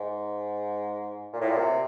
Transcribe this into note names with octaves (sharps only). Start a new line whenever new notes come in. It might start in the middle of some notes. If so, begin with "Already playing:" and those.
Already playing: G#2
A#2
A2
A#2
C3